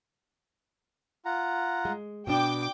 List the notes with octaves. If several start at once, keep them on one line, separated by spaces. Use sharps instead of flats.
F4 F#5 A#5
G#3
B2 B3 D4 G5 D6